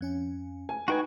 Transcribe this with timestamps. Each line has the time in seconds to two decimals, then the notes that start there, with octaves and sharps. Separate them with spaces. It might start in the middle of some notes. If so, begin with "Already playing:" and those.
0.01 F2 C#4 G#5
0.69 G#5
0.88 D#4 F#4 B4 G5 G#5